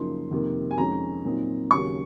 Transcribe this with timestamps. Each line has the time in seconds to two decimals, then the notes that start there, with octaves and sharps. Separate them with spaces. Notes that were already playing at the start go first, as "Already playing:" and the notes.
Already playing: F#2 C#3 F3 A#3 D#4 C6
0.31 F2 C3 D#3 A#3
0.71 G#5
0.78 F2 D#3 G#3 C#4 A#5
1.24 A#2 F#3 C4 D#4
1.71 D#2 C#3 F#3 C#6